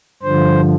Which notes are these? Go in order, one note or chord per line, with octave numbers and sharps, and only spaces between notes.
G2 D3 F3 C5